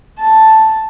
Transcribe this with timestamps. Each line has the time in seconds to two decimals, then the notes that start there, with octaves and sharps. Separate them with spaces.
0.19 A5